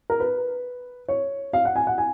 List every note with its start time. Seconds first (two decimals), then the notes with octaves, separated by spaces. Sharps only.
0.10 A#4
0.20 B4
1.08 C#5
1.53 F5
1.65 F#5
1.76 G#5
1.87 F#5
1.98 G#5